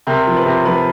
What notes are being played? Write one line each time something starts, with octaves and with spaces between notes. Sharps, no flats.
C3 A#4
F3
B4
C3
F3 B4